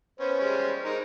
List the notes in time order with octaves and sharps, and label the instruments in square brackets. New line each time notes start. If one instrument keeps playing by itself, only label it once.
[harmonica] B3 C#4 [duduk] C5
[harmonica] G3 G#3 C#4
G#3 D#4 A#4